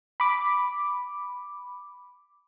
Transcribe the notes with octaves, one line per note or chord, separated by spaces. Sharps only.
B5 D6